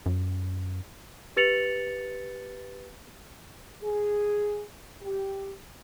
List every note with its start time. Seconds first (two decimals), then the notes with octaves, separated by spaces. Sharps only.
0.06 F#2
1.36 G4 B4 A6 C#7 F7 F#7
3.82 G#4
5.02 G4